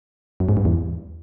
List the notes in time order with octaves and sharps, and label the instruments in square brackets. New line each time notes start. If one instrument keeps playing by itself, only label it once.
[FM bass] F#2
G#2
G2
E2